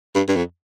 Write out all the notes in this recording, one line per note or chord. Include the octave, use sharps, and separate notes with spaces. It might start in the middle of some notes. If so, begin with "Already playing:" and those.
G2
G2
F2